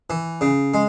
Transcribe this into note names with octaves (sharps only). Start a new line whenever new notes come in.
E3
C#3
G#3